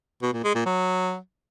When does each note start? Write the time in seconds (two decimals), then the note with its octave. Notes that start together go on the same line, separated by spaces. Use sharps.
0.22 B2
0.33 A#2
0.44 G#3
0.55 A#2
0.66 F#3